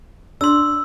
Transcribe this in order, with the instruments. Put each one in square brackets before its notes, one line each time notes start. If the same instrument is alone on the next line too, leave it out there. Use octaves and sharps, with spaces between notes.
[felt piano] D4 [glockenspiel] C6 E6